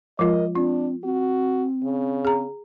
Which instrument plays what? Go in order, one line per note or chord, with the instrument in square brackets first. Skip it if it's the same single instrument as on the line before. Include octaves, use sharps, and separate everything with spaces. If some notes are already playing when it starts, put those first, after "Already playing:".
[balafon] F3 G#3 F4 [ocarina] A#4 [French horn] D#5
[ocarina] C4 [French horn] D4 [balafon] F4
[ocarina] C4 [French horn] F#4
[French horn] C#3
[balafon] G#4 A#5